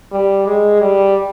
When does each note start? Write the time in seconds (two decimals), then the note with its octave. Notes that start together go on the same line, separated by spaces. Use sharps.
0.12 G3
0.46 G#3
0.80 G3